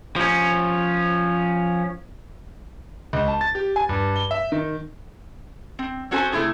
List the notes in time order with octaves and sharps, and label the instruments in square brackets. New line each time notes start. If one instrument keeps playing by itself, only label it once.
[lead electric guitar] F3 C#4
[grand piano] C#2
A5
A6
G4
G#5
G2
G7
E5
D#3
[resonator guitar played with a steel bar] C4
C4 C#4 F#4 A4 C5 G#5
C3 A3 E4 F4 G#4